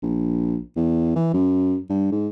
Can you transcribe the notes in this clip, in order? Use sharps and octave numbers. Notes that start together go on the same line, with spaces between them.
A#1
E2
E3
F#2
G2
G#2